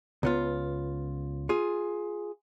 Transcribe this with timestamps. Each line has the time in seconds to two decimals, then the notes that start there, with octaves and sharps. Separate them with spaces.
0.23 C#2 B3 F4
1.49 F4 G#4